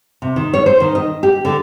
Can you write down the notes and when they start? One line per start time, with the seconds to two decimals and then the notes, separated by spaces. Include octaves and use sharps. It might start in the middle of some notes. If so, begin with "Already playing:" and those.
0.22 C3
0.36 D#3
0.54 C#5
0.66 C5
0.80 D#3
0.95 D#5
1.23 G4
1.45 D3